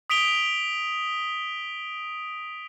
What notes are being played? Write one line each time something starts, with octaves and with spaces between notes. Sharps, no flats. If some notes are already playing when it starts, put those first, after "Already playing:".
D#6 B6 D7 F7 G7